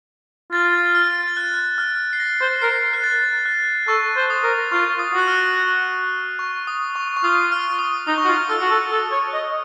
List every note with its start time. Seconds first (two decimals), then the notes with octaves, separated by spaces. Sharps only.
0.52 F4 A6
0.95 F6
1.28 A6
1.37 F#6
1.78 F6
2.13 C7
2.20 A#6
2.41 C5
2.62 A#4 C7
2.93 F#6
3.04 A6
3.46 F#6
3.88 A4 C#6
4.16 C5
4.30 D#6
4.43 A#4
4.72 F4 C#6
4.99 D#6
5.14 F#4 F#6
5.28 F6
6.39 C#6
6.67 D#6
6.96 C#6
7.17 C#6
7.23 F4 D#6
7.52 F6
7.73 F6
7.79 D#6
8.07 D#4 D#6
8.18 C#6
8.25 F4 F#4 D#6
8.50 A4 F6
8.61 F#4
8.70 A4
8.92 A4
9.12 C#5
9.34 D#5